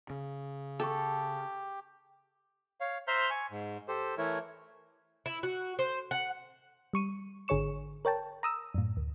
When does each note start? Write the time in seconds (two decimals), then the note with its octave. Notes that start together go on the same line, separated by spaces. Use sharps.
0.10 C#3
0.80 G4 A4 A5 C#6
2.81 C#5 F5
3.07 C5 E5 A#5 C6 F6 G6
3.30 G#5 C#6
3.51 G#2
3.88 G4 A4 C5
4.18 E3 A3 E4 A#4 C#5
5.26 E4
5.43 F#4
5.79 C5
6.11 F#5
6.93 G3 C#6 D#7
7.48 G#1 D3 G#4 C#5 C#6 E7
8.05 A#4 C#5 G5 A5
8.43 A#5 D#6 E6
8.74 F#2 A2
8.97 D2